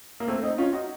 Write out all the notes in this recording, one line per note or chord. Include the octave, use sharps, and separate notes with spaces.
A#3
A3 C4
C4 D#4
C#4 F4
D#4 F#4